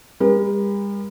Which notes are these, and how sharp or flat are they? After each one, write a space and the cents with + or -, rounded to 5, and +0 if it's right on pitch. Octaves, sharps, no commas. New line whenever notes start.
G3 +45 A#4 +40